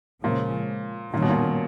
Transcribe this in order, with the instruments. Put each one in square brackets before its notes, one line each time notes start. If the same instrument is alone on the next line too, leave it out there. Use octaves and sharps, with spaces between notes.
[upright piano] A#2 [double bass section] C#3 F3 G#3 C#4
[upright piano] A#2 [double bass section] D#3 G3 A#3 C#4
[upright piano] B2
A#2